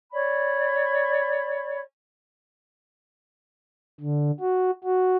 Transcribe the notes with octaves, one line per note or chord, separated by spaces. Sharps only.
C#5 D5 B5
D3
F#4
F#4